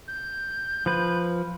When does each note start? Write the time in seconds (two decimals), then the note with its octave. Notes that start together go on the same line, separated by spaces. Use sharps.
0.07 G6
0.86 F3 B4